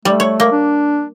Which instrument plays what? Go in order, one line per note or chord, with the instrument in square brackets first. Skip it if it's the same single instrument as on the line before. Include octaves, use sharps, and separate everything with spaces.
[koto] G3 [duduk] A3
[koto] C#5
A#3
[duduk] D4